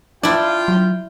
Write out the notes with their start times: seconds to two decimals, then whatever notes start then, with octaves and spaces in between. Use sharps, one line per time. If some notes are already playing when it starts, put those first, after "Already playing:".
0.23 D4 E4 F4 D5 G5
0.68 F#3